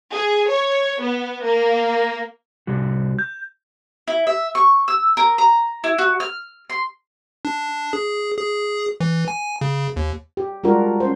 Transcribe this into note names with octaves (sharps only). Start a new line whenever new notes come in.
G#4
C#5
B3
A#3
C3 G3 F#4
G6
E4
E5
C#6
E6
A#4
A#5
E4
F#4
F6
C6
D4
G#4
G#4
E3
G#5
C#3
D#2
G4
G3 G#3 D4 F4 F#4 A#4
C#4 C5